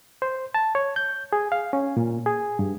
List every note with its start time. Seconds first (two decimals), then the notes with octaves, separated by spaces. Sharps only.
0.22 C5
0.54 A5
0.75 C#5
0.96 G6
1.33 G#4
1.52 F5
1.73 C#4
1.97 A#2
2.26 G#4
2.59 G2